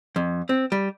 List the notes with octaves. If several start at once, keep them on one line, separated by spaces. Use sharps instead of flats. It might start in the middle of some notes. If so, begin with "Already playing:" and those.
F2
C4
G3